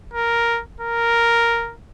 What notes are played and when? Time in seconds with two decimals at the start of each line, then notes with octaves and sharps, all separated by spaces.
0.14 A#4
0.80 A#4